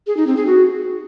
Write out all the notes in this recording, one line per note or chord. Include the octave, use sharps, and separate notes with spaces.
G#4
D#4
C4
G#4
F#4